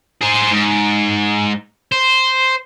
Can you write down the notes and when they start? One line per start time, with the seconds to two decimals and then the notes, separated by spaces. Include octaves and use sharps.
0.21 G#4 C5
0.51 G#2
1.92 C5